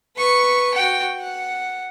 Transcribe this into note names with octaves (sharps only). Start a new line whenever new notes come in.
B4 C#6
F#4 G5
F#5